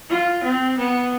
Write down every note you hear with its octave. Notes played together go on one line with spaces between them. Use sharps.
F4
C4
B3